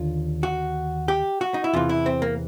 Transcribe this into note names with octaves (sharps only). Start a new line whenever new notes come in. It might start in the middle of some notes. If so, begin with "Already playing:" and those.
Already playing: D#2 D3 F4
F#4
G4
F#4
D#4
E4
E2 C3 E3 F4
E4
C4
A#3